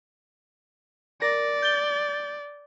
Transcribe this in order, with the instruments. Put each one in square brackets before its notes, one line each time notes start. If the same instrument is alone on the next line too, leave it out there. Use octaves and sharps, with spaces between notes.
[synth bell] A#4 A#6 [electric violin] D5
[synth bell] G6 A6 G7